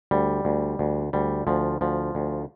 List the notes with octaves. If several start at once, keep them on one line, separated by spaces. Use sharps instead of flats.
D2 G3
D2
D2
D2 G3
D2 F3
D2 F3
D2